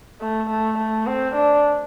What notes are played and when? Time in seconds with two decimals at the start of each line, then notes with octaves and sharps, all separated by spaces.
0.21 A3
0.49 A3
0.78 A3
1.06 C4
1.35 D4